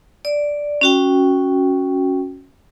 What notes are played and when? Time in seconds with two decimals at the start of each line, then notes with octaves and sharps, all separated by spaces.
0.25 D5
0.81 C#4 F#4 G5